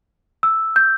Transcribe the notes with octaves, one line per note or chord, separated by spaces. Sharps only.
E6
G6